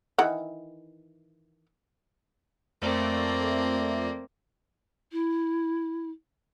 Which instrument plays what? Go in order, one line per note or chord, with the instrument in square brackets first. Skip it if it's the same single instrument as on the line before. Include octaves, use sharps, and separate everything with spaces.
[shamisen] D#3 E3 F#5
[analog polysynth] F2 A3 D5 [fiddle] A#3 C4
[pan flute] E4